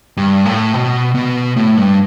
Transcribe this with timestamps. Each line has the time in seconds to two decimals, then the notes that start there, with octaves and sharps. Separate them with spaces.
0.17 G2
0.45 A2
0.74 B2
1.15 B2
1.56 A2
1.77 G2